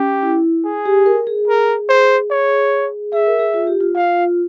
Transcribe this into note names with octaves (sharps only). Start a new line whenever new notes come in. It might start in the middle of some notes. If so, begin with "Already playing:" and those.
Already playing: C#4 G4
E4
G#4
G4
A#4
G#4
A#4
C5
C#5
G#4 E5
A#4
G#4
F4
G4
F4
F4 F5